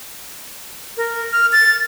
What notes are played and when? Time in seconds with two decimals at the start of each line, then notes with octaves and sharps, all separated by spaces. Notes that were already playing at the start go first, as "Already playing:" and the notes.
0.97 A#4
1.32 F6
1.53 A6